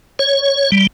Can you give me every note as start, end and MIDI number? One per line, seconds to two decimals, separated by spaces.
0.19 0.71 73
0.72 0.87 55